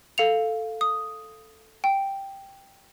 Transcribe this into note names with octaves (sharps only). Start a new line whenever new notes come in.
A4 F5 C#7 F7
D#6
G5